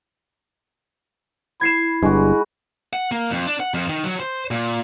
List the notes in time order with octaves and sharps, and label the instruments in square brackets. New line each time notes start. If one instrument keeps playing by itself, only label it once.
[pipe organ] E4 [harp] G#6 C7 E7
[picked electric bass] G1 G2 [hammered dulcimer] G#3 F#4
[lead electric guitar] F#5
A#3
F2
D4
F#5
F2
D#3
F#3
C5
A#2